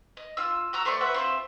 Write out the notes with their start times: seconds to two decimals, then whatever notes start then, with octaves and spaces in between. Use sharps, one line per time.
0.17 D#5
0.37 F4 E6
0.73 F#4 A#5 E6
0.85 A3 C5 D5 C#6
1.01 F#4 B4 E5
1.14 C4 F4 E5